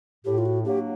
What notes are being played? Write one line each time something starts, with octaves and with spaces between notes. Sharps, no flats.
A2 G4
F4
F#4
F#3 A#3 D4 G4